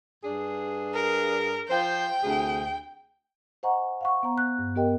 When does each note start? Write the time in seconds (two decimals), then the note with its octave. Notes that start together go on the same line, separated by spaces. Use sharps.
0.23 G2 D4 G#4
0.94 A#4
1.68 F3 C5 G5
2.23 D2 C3 G#4
3.63 C5 D#5 F#5 G#5 A#5 C#6
4.01 F5 F#5 C#6
4.23 B3 C5 A#5
4.38 F#6
4.59 G2
4.76 B3 G4 A#4 D#5 G5